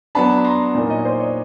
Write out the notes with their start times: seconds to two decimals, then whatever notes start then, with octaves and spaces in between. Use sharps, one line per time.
0.15 F#3 B3 D4 A5 B5
0.37 B5
0.45 A#5 C6
0.75 A#2 F#3 A#3 D#4
0.90 C#5 D#5
1.05 C5 D5
1.20 C#5 D#5